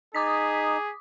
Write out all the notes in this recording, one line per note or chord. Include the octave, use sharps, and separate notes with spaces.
D#4 G#4 D6 D#6 B6